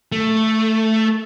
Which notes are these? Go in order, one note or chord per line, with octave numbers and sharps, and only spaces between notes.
A3